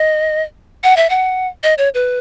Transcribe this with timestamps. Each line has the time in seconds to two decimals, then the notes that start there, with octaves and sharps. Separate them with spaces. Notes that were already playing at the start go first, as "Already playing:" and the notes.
Already playing: D#5
0.84 F#5
0.97 E5
1.10 F#5
1.63 D#5
1.78 C#5
1.94 B4